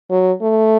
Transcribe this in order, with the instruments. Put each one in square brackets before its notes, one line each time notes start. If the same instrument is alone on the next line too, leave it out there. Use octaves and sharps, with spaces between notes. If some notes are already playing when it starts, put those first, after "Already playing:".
[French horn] F#3
A3